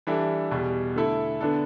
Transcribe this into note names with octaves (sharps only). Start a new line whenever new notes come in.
E3 G3 D4 A4 E5
E2 B2 G3
D3 A3 E4 A4 E5
D3 B3 D4 A4